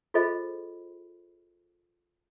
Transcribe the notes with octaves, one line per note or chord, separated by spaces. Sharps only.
F4 G#4 A4 C5 D#5 B5